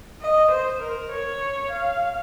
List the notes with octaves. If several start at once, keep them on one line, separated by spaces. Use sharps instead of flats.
D#5
C5
A#4
C#5
F5